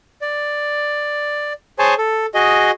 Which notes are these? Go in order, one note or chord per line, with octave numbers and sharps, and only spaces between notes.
D5
G#4 C5 C#5 G#5 A5
A4
F#4 G#4 D#5